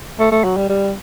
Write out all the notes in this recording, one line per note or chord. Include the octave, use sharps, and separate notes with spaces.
A3
A3
F#3
G3
G3